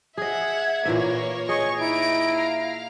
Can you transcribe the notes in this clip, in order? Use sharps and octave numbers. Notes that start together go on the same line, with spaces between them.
G#4 D#5 E5 F#5 G#6
A#2 E3 A#3 C#5 E5
G#4 C#5 D#5 C#6 C#7
D#4 E4 A#5 D7
F5